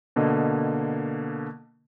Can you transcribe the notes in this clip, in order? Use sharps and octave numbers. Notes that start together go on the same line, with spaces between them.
B2 D3 A#3 D#5